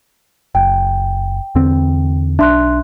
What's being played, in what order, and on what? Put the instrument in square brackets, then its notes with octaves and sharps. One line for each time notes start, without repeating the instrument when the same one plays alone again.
[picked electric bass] F#1 [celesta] G5
[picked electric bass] E2 D3 C4
[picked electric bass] B1 D4 [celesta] E5 C6 F#6